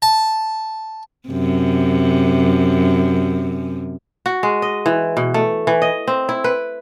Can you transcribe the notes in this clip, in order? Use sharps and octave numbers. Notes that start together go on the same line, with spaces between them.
A5
F#2 C3
F#4
G#3
D#5
E3
B2
A3
E3
D#5
C4
E4
B4